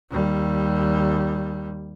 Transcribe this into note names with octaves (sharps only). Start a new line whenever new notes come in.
D#2 G3